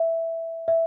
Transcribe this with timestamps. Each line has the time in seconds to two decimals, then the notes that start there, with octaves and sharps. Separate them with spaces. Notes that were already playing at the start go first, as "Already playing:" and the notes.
Already playing: E5
0.68 E5